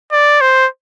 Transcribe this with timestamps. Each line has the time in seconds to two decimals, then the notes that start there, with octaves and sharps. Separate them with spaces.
0.12 D5
0.41 C5